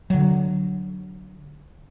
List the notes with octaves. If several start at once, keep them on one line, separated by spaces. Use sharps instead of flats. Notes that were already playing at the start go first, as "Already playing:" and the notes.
D3 F#3